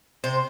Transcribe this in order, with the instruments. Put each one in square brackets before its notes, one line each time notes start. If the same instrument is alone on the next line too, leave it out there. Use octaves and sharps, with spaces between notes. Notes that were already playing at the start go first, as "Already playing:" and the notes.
[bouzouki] C3 C5